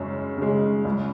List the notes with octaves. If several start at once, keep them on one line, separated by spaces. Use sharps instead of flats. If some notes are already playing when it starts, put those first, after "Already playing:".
Already playing: F#2 C#3 G#3
C#3 G#3
C#2